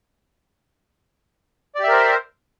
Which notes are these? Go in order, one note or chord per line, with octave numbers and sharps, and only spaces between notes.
G4 A#4 C5 D5 E5